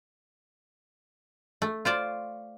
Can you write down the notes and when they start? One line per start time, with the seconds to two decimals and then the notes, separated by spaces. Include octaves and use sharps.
1.62 A3
1.85 F4 C5 D5